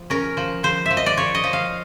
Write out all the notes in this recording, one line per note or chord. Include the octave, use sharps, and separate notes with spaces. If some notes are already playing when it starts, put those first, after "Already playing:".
Already playing: F3
C#4 A#4
F3
F3 C5
F3 E5
D#5
D5
F3 C#5
D#5
F3
F5